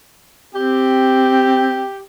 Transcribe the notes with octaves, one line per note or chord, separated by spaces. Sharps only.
C4 G4